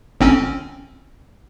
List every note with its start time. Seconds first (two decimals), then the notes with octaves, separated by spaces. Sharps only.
0.21 G1 C4 C#4